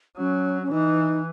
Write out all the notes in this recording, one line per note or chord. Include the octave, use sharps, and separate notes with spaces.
F#3 C#4
C#4
E3 D#4